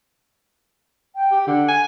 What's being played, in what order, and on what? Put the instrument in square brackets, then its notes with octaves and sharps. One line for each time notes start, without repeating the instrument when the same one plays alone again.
[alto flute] G5
[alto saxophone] G4
[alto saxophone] D3 [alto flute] F#5
[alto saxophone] G#5